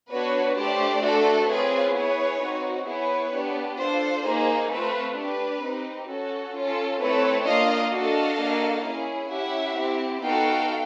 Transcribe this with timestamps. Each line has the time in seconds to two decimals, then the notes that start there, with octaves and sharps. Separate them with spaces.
0.11 B3 D4 F#4 B4 C#5
0.57 A3 D4 G4 C5 D5
1.03 A3 D4 F#4 A4
1.49 C4 F4 G#4 B4 C#5
1.95 B3 E4 G#4 B4 C#5
2.42 C4 D#4 F#4
2.87 B3 E4 G#4 B4 C#5
3.33 B3 D4 G4
3.79 D4 F4 A4 C5
4.25 A#3 D#4 G#4
4.71 A3 C4 F4 B4
5.17 D4 G4 B4
5.63 C4 D#4 G4
6.09 C#4 F#4 A4
6.55 C#4 F4 A4
7.01 A3 C4 E4 A4 B4 C#5
7.47 A#3 D4 F4 D#5 F5
7.93 D4 F#4 A4 D#5 F5
8.39 A#3 D4 F#4 A4
8.85 C#4 E4 G#4
9.31 C#4 E4 G4 E5 F#5
9.77 C4 E4 G4
10.23 B3 D#4 F#4 A4 F5 G5